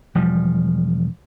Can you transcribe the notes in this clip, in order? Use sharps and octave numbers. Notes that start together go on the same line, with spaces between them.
E1 F3 G3